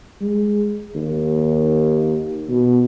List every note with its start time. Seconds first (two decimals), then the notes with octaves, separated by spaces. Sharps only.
0.21 G#3
0.95 D#2
2.50 B2